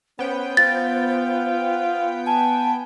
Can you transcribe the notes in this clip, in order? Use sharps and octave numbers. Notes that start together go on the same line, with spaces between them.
B3 C#4 C5 G5
F4 A6
G#5 A5